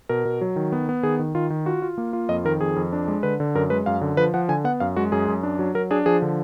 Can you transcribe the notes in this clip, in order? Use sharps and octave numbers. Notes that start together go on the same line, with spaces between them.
B2 A#4
B2
F#3
D#3
B3
B3
D#3 G#4
D#3
D#3 F4
D#3
F4 F#4
F4
A#3
F4
F2 D#5
D#3 A#4
F2 G#4
F2
D4
G#3
D3 B4
D3
F#2 A#4
G#3 B4
F#2 F5
D3
F3 B4
F3 F#5
D3 G#5
B3 F#5
F#2 F5
G#3 F#4
F#2 G#4
F#2
D4
F#3
F#3 A#4
D4 G#4
F3 G#4
D3